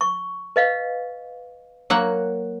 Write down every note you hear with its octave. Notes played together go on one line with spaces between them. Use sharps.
C#6
B4 D#5 F5
F#3 A#3 F#5